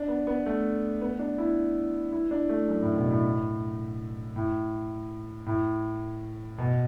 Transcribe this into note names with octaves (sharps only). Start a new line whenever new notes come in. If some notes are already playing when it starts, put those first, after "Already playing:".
Already playing: D4
B3
B3
A3
B3
D4
E4
E4
D4
A3
F#2
A2
B2
A2
A2
A2
B2